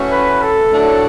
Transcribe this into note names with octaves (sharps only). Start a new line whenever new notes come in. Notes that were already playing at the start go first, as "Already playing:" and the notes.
Already playing: E3 A3 C#4 F#4
B4
A4
A2 F#3 A3 D4